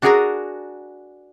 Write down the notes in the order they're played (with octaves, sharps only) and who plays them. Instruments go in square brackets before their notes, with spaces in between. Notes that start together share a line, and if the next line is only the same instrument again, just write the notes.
[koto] D4 F#4 G#4 A#4 G#5 A#5